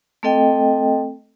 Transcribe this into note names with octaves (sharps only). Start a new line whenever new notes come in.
A3 C4 A4 D#5 G5